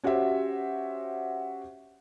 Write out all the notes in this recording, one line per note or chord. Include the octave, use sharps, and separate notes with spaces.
C#4 F#4 G4 C5 E5